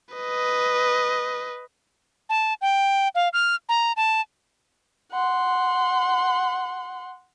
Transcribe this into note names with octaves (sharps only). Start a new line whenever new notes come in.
B4 D#5
A5
G5
F5
F6
A#5
A5
F#5 C6